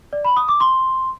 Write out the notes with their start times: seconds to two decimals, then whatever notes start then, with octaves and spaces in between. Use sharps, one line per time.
0.13 D5
0.25 B5
0.36 D#6
0.48 D6
0.60 C6